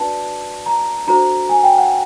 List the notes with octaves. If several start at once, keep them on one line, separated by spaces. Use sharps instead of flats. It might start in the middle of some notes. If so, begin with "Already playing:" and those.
Already playing: D4 F#4 B4 D5 A5
A#5
D4 F#4 A4 C5 A#5
G#5
G5
F#5